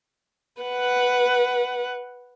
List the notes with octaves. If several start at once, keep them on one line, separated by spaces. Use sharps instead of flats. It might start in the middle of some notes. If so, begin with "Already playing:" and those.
B4 F#5